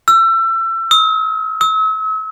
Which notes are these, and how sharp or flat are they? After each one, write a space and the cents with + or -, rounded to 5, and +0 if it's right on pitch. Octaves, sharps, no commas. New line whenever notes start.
E6 +30
E6 -45
E6 -40